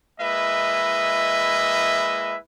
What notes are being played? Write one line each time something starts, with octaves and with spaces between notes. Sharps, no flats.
G#3 A#3 E4 B4 D#5 E5